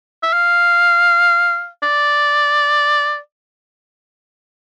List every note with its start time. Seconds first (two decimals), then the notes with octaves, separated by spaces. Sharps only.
0.23 E5
0.33 F5
1.83 D5